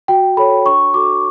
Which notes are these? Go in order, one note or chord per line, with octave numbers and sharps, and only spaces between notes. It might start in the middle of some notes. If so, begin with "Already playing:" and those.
F#4 G5
A4 C#5 B5
D4 C#6
F#4 A4 D6